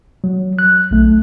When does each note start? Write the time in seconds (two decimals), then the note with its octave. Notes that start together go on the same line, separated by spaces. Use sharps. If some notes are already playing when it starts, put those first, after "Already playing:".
0.24 F#3
0.59 F#6
0.91 B1 A3